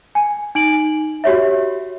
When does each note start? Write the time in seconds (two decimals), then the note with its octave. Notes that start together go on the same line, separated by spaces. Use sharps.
0.15 G#5
0.55 D#4 D7 F#7
1.24 F#4 G4 C#5 E5